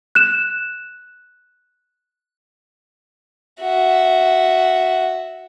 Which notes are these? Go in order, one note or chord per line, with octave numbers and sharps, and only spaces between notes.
F#6 E7
F#4 E5